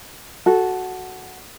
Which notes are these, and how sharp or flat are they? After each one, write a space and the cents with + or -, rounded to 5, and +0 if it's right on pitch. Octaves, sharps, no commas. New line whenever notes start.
F#4 +0 A4 -10